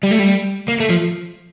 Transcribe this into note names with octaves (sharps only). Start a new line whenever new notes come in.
G3
A3
G3
A#3
A3
F3